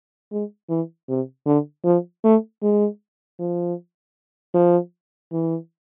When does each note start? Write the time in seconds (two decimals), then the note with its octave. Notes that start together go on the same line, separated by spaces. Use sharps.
0.32 G#3
0.69 E3
1.09 C3
1.46 D3
1.85 F3
2.24 A3
2.63 G#3
3.39 F3
4.54 F3
5.32 E3